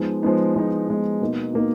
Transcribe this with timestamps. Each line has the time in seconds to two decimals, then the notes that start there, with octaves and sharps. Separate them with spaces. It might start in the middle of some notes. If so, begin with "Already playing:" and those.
Already playing: F3 G#3 B3 D#4
0.22 F3 G#3 B3 D#4
0.55 F3 G#3 B3 D#4
0.88 F3 G#3 B3 D#4
1.21 B2 A#3 D#4
1.53 B2 A#3 D#4